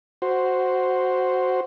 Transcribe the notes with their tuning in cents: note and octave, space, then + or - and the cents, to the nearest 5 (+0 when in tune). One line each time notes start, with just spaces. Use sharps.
F#4 +0 C5 +0